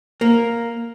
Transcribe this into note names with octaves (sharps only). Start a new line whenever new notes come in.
A#3